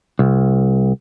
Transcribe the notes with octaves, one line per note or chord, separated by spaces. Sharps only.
C2